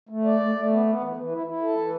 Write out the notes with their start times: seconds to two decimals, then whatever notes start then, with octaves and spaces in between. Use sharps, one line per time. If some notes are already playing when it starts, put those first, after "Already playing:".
0.09 A3
0.25 D5
0.40 A3
0.55 A3
0.70 B3
0.86 B3
1.01 E3
1.17 E3
1.31 E4
1.47 E4
1.62 A4
1.78 E3